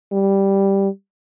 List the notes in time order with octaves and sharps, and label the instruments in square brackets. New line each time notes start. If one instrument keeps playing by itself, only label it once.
[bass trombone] G3